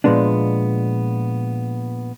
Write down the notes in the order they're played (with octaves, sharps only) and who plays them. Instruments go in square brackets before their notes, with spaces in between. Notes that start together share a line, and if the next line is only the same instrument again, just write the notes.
[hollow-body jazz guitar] A#2 F3 G#3 B3 D4